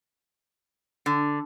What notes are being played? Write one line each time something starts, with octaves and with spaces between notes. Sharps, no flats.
D3